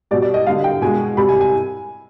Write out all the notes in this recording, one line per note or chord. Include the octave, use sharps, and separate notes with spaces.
B2 G3 D5
D5
D#5
D3 G3 F5
G5
B2 G#3 G#5
C3 G3 B5
G#5
G#5